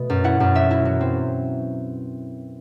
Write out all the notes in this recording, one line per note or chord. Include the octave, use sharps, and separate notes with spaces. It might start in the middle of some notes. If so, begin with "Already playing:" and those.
Already playing: B2 A3
F#2
E4 F#5
F#2
F#3 E5
E4
F#3
C4